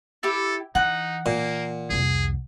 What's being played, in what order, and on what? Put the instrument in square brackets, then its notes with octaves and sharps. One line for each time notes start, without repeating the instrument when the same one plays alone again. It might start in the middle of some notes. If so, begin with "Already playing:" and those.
[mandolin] E4 G4 [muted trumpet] A4
[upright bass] E3 [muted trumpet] D#4 [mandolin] F#5
[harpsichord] A#2 [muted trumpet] A#3
[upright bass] C2 F2 [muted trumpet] G#4